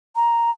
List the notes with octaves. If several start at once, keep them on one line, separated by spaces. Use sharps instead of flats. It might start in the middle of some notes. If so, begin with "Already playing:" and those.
A#5